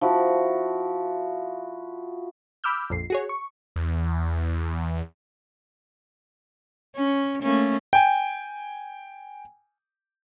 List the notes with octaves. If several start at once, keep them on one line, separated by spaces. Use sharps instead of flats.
F3 E4 F#4
B5 D6 E6 F6 G6
A#1 F2 C7
F#4 G#4 C#5
C#6
E2
C#4
A3 A#3 C#4
G5 G#5